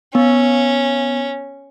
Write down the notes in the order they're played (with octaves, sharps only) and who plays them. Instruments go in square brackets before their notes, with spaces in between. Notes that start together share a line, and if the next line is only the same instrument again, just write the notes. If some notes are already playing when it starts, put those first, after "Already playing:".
[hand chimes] B3 [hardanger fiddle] C#4